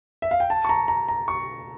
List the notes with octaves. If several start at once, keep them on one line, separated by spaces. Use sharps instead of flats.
E5
F5
G5
A5
C#6
A#5
A#5
A#5
C#6